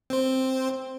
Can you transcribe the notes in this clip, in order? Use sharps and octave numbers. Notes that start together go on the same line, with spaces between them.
C4 C5